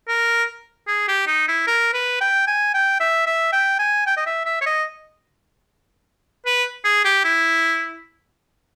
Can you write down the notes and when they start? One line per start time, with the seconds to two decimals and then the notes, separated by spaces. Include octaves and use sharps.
0.08 A#4
0.87 G#4
1.08 G4
1.27 D#4
1.48 E4
1.67 A#4
1.94 B4
2.21 G5
2.47 G#5
2.74 G5
3.00 E5
3.26 E5
3.53 G5
3.79 G#5
4.07 G5
4.17 D#5
4.26 E5
4.45 E5
4.61 C#5
4.66 D#5
6.46 B4
6.84 G#4
7.05 G4
7.24 E4